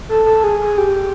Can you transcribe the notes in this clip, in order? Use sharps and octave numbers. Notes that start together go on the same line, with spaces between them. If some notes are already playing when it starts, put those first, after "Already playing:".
A4
A4
G#4
G#4
G4